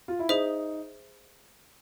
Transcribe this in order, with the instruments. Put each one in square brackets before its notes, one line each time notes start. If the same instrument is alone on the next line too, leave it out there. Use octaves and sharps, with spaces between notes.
[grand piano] F4
E4
[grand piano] D#4 [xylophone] G#4 C5 E5